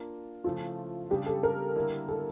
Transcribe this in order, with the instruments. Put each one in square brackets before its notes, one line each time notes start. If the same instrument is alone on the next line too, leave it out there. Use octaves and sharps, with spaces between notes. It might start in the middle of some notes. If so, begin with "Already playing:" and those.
Already playing: [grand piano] A#3 D4 F4
[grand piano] C#3 F3 A3 E4 A4 [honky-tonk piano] F4
[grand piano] C#3 G3 D4 [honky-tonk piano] G4
[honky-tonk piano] A4
A#4
[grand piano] D3 G3 A#3 E4
[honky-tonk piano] A4